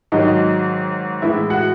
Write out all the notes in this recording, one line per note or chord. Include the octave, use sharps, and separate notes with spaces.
G#2 D#3 F#3 D#5
A2 E3 G#3 E4 E5
F#4 F#5